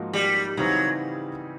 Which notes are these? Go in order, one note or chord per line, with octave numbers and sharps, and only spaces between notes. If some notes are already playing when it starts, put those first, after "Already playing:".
Already playing: G#2 F3 A#3 D#4 F#4
G3
C#3 E3 F#3 G3 C4 D#4